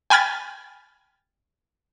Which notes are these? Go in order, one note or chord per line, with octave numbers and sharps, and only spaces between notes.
G5 G#5 B5 F6 G#6 A6